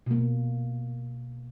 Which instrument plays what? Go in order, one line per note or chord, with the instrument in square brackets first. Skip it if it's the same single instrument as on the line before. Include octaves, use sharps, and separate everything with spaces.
[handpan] B2 A#3